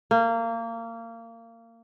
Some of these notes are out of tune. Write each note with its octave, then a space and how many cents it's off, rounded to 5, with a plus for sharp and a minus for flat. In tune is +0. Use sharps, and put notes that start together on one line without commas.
A#3 -25